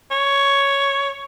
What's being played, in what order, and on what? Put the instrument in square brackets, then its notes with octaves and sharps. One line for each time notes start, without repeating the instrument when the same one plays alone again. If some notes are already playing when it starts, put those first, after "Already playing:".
[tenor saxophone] C#5